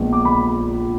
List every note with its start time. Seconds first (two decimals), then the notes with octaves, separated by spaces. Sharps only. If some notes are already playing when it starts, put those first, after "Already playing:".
Already playing: A#1 A#2 G#3 B3
0.13 D6
0.25 B5